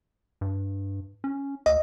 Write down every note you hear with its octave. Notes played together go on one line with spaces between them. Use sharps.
G2
C#4
D2 D#5